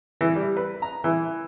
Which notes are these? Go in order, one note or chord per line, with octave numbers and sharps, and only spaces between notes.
E3
G3
B4
A#5
E3